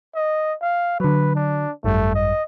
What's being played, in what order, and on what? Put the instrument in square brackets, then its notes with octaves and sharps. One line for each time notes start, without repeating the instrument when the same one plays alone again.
[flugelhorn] D#5
F5
[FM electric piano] D3 F#3 [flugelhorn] B4
[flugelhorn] D4
[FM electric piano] G#1 F#2 G3 [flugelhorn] A3
[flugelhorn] D#5